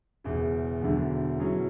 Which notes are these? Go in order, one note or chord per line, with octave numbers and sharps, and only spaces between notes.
E1 E2 C#3
E1 E2 D3 F#3
B2 F#3 C#4 E4 G#4